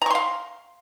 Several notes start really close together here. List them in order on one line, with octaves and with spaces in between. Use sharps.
A#5 C#6 C6 F5